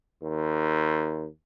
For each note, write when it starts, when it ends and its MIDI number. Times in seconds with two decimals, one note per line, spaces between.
0.22 1.26 39